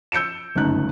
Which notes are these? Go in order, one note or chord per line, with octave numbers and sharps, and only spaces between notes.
E6 G6 C#7 D7 E7
G1 C#2 F#2 A3 D#4 F#6